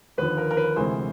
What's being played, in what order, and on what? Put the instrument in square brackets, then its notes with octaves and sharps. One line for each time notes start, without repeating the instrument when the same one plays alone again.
[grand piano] D#2 D3 F3 B4
A#4
A#4
B4
D2 C3 E3 G#3 C5